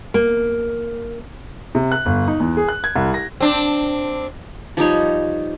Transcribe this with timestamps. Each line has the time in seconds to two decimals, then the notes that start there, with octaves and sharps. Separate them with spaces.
0.14 A#3
1.75 C3
1.92 F#6
2.06 G1
2.27 D#4
2.40 E2
2.57 G#4
2.68 F#6
2.84 G#6
2.96 C2
3.14 A#6
3.40 C4 D4
4.77 F3 G3 D#4 C#5